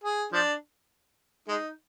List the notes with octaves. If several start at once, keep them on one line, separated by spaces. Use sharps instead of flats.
G#4
F3 D4
G#3 D#4